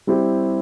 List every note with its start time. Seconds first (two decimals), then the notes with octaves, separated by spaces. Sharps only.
0.07 G3 C4 E4 G4